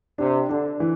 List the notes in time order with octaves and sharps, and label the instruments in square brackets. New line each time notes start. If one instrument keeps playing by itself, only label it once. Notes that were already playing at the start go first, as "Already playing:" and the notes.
[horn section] C3 [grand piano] D4
[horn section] D3 [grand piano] D4
[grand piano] E3